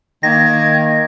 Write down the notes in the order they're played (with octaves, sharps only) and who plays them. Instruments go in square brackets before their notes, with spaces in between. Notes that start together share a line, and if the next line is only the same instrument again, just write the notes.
[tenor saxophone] D#3 [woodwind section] A#3 [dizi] G#6 [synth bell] A#6